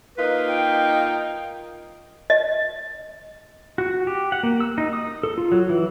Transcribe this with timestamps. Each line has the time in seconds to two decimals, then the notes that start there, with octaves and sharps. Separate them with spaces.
0.17 A#3 D#4 F4 B4
0.48 G5
2.30 D#5
3.78 F#4
4.07 G4
4.32 F#5
4.43 A#3
4.60 E6
4.78 D#4
4.93 D#6
5.23 A4
5.38 F4
5.52 F#3
5.69 E3